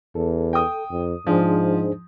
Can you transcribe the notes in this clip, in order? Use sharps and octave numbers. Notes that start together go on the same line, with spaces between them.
E2 A4
G5 D#6
F2
G#2 F3 D4 G#4 C5